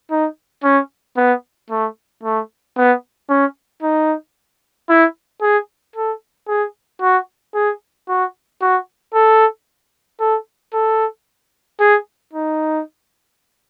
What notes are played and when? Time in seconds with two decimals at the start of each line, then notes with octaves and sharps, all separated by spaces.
0.11 D#4
0.64 C#4
1.17 B3
1.70 A3
2.24 A3
2.77 B3
3.29 C#4
3.83 D#4
4.89 E4
5.42 G#4
5.96 A4
6.48 G#4
7.01 F#4
7.55 G#4
8.09 F#4
8.62 F#4
9.14 A4
10.20 A4
10.74 A4
11.80 G#4
12.33 D#4